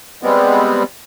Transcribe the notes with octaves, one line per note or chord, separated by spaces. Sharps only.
G3 G#3 B3 C4